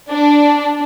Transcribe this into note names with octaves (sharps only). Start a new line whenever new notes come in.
D4